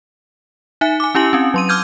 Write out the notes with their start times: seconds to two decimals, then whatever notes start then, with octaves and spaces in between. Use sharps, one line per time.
0.81 D#4 E5 G#5
1.00 G#5 D6
1.15 C#4 E4 G4 G#5 F#7
1.33 C4 C#4
1.54 F#3 C6 D#7
1.69 D6 E6 F6 G6 G#6